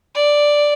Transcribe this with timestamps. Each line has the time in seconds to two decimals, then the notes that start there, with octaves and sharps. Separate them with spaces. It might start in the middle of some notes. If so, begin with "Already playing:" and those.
0.14 D5